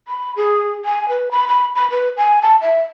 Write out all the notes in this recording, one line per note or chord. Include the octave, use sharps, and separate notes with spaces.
B5
G#4
G#5
B4
B5
B5
B5
B4
G#5
A5
E5